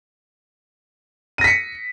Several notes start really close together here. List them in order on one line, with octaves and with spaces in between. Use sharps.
D#7 A#6 B6 C#7